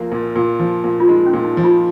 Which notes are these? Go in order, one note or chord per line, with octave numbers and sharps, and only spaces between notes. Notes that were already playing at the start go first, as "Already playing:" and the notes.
Already playing: C2 F3 A#3
A#2
A#2
F3
A#2
F4
G#3 D#4
C#4
A#2
D#4
F3
F4